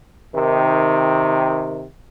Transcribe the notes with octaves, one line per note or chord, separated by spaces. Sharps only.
C3 D#3